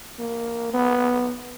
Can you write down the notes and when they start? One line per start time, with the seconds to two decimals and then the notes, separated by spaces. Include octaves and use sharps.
0.19 A#3
0.73 B3